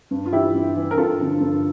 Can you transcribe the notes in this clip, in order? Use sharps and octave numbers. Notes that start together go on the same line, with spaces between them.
G2
F4
E3 E4 G4
G2
E3
A#4
G2 F4 A4
D3 F3
G2